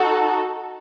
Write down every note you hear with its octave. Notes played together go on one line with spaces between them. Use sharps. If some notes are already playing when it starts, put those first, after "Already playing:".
Already playing: D#4 F#4 A4